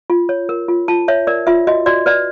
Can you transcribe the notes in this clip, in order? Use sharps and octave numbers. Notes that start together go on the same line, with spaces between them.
F4
C#5
A#4
F4
F4 A5
C#5 E5
A#4 D5
F4 E5
F#4 D#5
F#4 D5
B4 D5